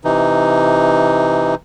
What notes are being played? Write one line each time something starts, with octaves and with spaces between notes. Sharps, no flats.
C3 E3 D#4